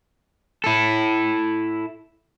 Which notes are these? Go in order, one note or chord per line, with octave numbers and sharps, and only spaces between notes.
E4 A4